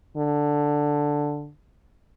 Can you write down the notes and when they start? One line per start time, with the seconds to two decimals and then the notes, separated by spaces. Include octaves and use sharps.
0.17 D3